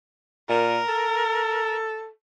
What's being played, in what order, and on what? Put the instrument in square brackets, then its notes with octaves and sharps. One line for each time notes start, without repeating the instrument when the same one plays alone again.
[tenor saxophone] A#2 [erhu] A#4
[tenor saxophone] A4